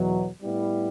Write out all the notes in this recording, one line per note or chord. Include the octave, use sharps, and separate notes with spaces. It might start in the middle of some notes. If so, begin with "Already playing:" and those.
Already playing: E2 B2 F#3
A2 G3 B3 E4